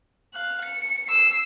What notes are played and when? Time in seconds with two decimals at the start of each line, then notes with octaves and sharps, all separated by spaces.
0.34 F5 F#6
0.65 C#7
1.09 E6 C7